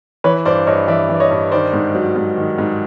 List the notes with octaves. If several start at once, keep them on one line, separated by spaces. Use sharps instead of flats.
E3 B4 C#5
G2 C5 D5
G2 C#5 D#5
E3 D5 E5
E3
D5
C#5 D#5
G2
D#3 C5 D5
G#2
F#3
G#2
D#3
G#2